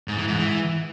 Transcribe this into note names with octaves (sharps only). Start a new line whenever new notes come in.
G#2
E3
G#2
E3